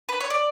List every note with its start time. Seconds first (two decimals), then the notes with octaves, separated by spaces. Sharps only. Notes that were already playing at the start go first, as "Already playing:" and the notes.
0.09 B4
0.20 C#5
0.30 D5